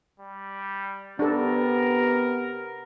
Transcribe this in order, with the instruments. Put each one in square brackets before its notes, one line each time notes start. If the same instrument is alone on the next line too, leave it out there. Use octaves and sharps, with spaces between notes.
[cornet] G3
[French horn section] C3 B3 G4 [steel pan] D4 A4 [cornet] A#4